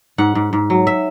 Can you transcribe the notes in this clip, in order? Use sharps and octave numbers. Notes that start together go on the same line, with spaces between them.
G#2 F#5
G#2
G#2
F#3
E5